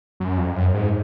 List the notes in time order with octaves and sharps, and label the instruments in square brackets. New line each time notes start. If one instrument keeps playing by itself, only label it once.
[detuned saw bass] F#2
F2
F#2
G#2